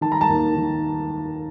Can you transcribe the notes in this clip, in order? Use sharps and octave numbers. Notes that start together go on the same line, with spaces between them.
D#3 A5
A#5
A5
D#2
D#3